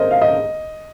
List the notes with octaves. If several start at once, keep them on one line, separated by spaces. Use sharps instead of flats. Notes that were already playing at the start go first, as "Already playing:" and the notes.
Already playing: A#4 C5 D#5
F5
D#5